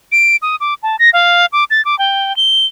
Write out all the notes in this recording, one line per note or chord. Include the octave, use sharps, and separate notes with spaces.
D7
D#6
D6
A5
A#6
F5
D6
A6
D6
G5
G7